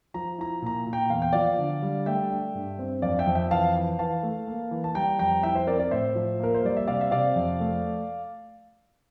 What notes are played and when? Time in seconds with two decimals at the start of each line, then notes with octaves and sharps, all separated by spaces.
0.14 F3 A#5
0.39 E4 A#5
0.62 A#2 A#5
0.86 A#2
0.93 G5 A#5
1.10 E2 F5
1.22 G5
1.33 F3 D5 F5
1.58 D3
1.82 G3
2.06 A3 E5 G5
2.30 D4
2.54 G2
2.79 C4
3.02 F2 D5 F5
3.19 E5 G5
3.27 F2
3.35 E5 G5
3.51 E3 F5 A5
3.75 E3
3.99 E3 F5 A5
4.23 A3
4.48 A#3
4.71 E3
4.84 A5
4.95 G3 G5 A#5
5.19 F2 G5 A#5
5.43 E4 E5 G5
5.55 C5 E5
5.67 C4 A#4 D5
5.79 A#4 D5
5.91 A2 C5 E5
6.15 F3
6.39 A#3 A#4
6.54 C5
6.63 G3 D5
6.77 E5
6.87 C3 D5 F5
7.01 E5
7.11 C3 D5 F5
7.36 F2
7.60 A3